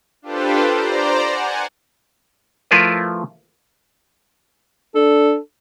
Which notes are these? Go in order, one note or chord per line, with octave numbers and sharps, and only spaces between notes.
D4 F4 G4 A4 B4 C5
C5 D5 A#5
F#5 G#5
F3 A3 E4 F4 A#4 B4
D4 A4